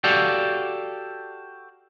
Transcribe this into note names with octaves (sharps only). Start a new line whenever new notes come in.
F#4 G4 A4 D5 F5